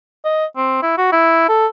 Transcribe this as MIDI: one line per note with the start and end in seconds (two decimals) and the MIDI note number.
0.24 0.45 75
0.56 0.79 60
0.82 0.98 64
0.98 1.09 66
1.12 1.47 64
1.49 1.67 69